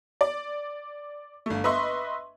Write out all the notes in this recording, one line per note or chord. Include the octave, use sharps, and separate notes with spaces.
D5
G1 A3
B4 D#5 E5 C6 C#6